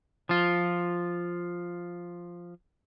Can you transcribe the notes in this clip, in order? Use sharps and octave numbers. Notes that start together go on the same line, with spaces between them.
F3 F4